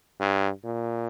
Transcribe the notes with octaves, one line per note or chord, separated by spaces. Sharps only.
G2
A#2